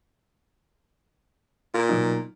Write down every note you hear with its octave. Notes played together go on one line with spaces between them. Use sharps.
A#2 F4
B2 F#3 D#4